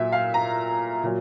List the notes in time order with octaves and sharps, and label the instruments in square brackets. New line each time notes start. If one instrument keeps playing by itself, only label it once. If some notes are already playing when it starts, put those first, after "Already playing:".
Already playing: [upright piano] A#2 F#3 E5
F5
A#5
A#2 F#3